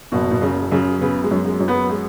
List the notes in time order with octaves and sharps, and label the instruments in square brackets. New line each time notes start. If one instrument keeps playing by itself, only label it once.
[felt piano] F#1 [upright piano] B2
[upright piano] B2
[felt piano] F#2 [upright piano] C#3
[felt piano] F#2 [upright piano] C#3
[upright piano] C#3 [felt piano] B3
[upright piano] G#3
[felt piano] F#2
[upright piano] G#3
[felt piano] F#2
[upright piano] B3
G#3